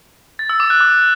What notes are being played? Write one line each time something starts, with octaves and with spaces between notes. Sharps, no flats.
A6
E6
D6
F#6
D6